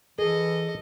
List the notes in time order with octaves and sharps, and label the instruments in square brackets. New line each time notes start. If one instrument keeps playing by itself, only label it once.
[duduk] E3 [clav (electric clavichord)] G#4 [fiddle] A4 D#5